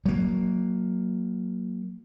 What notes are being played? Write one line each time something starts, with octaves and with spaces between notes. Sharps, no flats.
F#3 A#3